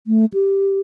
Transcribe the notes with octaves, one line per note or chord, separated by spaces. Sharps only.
A3
G4